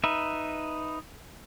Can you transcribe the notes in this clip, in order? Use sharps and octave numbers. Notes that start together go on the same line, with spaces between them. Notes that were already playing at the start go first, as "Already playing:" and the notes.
D#4 B4 E5